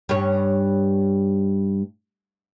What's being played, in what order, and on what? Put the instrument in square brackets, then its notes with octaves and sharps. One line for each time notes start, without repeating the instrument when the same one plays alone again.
[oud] G2 C#4